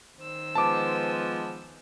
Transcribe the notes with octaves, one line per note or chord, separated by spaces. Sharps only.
D#3 C5 E6
F3 G#3 B3 A5 D6